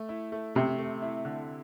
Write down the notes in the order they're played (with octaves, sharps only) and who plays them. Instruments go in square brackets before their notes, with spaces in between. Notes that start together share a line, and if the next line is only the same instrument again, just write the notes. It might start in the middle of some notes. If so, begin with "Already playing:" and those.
Already playing: [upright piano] A3
E4
A3
[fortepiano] C3 [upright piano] A3
[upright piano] A3
E4
D3